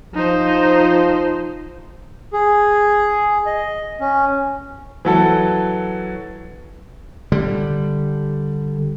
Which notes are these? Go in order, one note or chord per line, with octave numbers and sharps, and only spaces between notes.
F3 D#4 C5
G#4
D#5
C#4
E3 F#3 A4
D3 G3